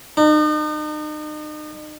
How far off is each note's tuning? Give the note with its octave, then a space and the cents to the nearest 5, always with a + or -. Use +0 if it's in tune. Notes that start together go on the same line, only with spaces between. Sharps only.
D#4 -40